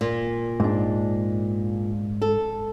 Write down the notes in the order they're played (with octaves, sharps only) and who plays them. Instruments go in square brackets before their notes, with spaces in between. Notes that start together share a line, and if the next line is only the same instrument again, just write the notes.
[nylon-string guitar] A#2
[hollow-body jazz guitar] G#2 D4
[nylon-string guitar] A4